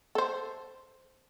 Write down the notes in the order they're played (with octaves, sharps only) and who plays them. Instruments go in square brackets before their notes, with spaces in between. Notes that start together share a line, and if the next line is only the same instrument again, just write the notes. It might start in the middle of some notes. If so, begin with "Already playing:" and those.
[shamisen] A4 C5